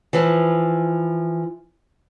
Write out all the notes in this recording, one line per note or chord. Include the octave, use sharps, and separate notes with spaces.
E3 F3